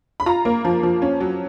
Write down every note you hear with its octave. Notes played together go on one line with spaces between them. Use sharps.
B5
F4 A#5
A#3
F3
F3
C#4
F#3